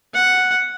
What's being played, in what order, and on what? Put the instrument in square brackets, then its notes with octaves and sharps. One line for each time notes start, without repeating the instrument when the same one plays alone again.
[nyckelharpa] F#5